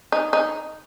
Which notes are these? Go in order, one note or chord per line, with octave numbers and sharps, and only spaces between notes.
D#4
D#4